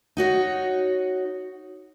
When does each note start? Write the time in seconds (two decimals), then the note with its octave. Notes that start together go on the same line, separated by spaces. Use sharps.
0.17 D#4 F#4 C#5